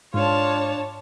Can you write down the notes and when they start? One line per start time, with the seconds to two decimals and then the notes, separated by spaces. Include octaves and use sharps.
0.14 G#2 D4 F4 C#5 A5